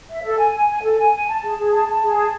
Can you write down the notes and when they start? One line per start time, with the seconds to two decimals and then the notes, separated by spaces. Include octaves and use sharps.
0.09 E5
0.23 A4
0.38 G#5
0.53 G#5
0.68 G#5
0.82 A4
0.98 G#5
1.13 G#5
1.28 A5
1.42 G#4
1.58 G#4
1.72 A5
1.87 A5
2.02 G#4
2.16 A5